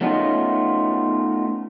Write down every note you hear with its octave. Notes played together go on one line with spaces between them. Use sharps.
A3 B3 C#4 D#4 F4